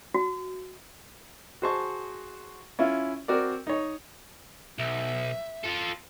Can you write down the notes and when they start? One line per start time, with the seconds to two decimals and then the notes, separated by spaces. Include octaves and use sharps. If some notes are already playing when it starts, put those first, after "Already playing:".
0.14 F#4
1.62 F#4 G#4 C5 A5 C#6
2.79 C#4 E4 F4
3.28 C4 F#4 A#4 D5
3.67 D#4 C#5
4.79 B1 E5
5.64 F4 A4